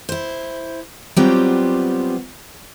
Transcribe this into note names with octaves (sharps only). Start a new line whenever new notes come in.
E4 C5
F#3 G3 B3 C4 F4 G4